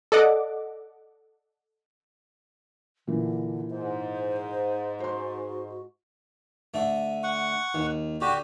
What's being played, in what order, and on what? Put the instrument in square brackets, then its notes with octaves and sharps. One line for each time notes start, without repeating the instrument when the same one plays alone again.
[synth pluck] A4 D5 D#5 F#5 D6
[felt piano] A#2 E3 [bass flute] D3
[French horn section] G#2 [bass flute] C5
[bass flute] F#4 [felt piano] C5 C6
[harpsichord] D3 A3
[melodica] F#5 C#6
[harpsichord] D#2
[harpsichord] D3 [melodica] F#4 G4